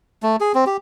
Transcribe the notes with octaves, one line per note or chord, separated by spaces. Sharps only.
A3
G#4
C4
G4